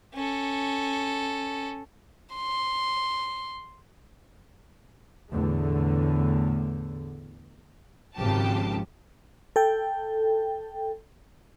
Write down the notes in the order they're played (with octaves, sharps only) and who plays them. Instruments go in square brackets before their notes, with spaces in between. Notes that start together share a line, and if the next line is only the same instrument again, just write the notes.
[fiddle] C#4 A4
[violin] C6
[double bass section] E2 A2 D3 A3
[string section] G#1 C#3 F3 G4 A5
[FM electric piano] A4 G5